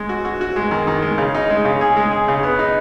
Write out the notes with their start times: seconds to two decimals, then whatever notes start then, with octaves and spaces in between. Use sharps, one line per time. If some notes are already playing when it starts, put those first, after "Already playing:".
Already playing: G#3
0.09 F#4
0.25 F#4
0.41 F#4
0.56 G#3
0.71 D#3
0.87 D#3
1.02 G#3
1.18 C#3
1.35 D#4
1.50 G#3
1.65 C#3
1.81 G#4
1.97 G#3
2.11 G#4
2.28 C#3
2.43 B3
2.59 D#4